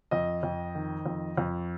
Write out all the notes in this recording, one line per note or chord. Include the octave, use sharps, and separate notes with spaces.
F2 D#5
F2
D#3
F2
F2